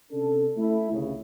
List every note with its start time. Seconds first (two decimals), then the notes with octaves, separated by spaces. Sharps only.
0.12 C3 C#4 D4 A4
0.57 A3 E4
0.91 G1 C2 C#3